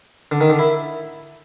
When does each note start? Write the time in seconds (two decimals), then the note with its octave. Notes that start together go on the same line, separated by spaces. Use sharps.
0.31 D3
0.41 D#3
0.50 D3
0.59 E4